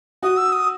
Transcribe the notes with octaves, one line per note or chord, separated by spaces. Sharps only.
F#4 D#6
E6
D#6